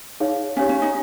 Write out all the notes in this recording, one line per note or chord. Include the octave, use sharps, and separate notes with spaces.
D#4 G#4 C#5 F5
C#4 G4 C#5 F5 G#5
C#4
D#4